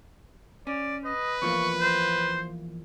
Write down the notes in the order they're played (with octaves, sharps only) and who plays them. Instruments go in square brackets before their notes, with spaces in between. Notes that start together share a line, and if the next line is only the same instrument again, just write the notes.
[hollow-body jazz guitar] C#4 [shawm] D5
[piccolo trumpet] B4 [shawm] D#5
[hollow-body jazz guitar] E2 F3 A#3 [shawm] C#6
[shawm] C5